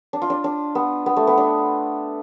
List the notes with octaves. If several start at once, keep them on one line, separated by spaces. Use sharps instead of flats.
D4
F4
D4
D4
B3
B3
A3
B3
D4